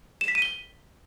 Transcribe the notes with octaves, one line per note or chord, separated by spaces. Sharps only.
E7
B6
D#7
G7